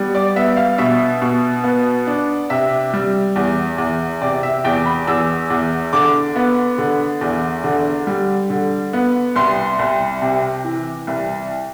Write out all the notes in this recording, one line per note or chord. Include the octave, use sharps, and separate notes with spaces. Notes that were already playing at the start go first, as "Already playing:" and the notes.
Already playing: G3 B3
D5
B3 E5
F5
B2 E5
B2
B3
D4
C3 E5
G3
E2
E2
C3 D5
E5
E2 G5
B5
E2 E6
E2
D3 D6
B3
D3
E2
D3
G3
D3
B3
C2 C6
C2
C3
E3
C2